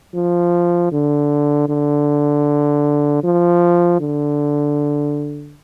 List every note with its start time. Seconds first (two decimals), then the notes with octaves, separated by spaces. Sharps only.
0.14 F3
0.92 D3
1.69 D3
3.23 F3
4.00 D3